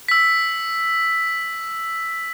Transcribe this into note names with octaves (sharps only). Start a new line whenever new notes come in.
E6 B6